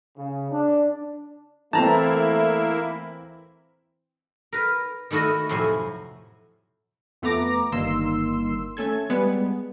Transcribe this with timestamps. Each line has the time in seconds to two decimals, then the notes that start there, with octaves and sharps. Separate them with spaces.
0.16 C#3
0.51 D4
1.73 E3 A3 A#3 C4 E4 A5 A#5
4.53 A#4 B4
5.11 D#3 A3 E4 F#4 D#5
5.49 F2 A2 C3 F#3 E4 G#5
7.22 F2 A3 B3 A#5 D6 A#6
7.72 G1 G2 D#3 A#3 C6 E6
8.77 A3 C#4 A4 G#6
9.10 G3 G#3 B3